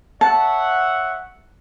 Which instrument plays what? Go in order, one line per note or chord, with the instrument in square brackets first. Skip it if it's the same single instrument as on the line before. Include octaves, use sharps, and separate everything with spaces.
[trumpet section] C#5 E5 F#5 [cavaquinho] A5